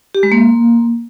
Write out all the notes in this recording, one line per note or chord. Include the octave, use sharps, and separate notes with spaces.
G4
G#3
A#3